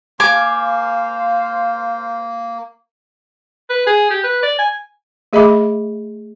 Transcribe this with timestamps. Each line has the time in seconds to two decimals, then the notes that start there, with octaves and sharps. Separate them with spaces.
0.20 A#3 C5 F5 G#5 D6
3.70 B4
3.87 G#4
4.10 G4
4.24 B4
4.43 D5
4.59 G#5
5.33 A3 G#4 D#5 E5 B5 D6